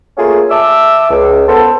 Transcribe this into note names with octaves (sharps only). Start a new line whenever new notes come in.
A3 A#3 C#4 F4 G#4
E5 A5 D6 E6
C#2
B3 A4 C5